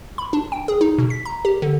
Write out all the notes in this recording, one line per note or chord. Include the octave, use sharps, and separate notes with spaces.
B5
D4
G5
G#4
D#4
B2
B6
A#5
G4
D3